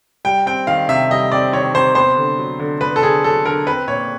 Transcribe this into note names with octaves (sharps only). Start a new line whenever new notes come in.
G3 G5
C4 G5
D#3 F5
C3 E5
G3 D#5
C4 D5
D#3 C#5
C3 C5
B3 C5
D3
F#3
D3
B3 B4
A4
D3 G#4
F#3 A4
D3 A#4
C4 B4
A#2 C#5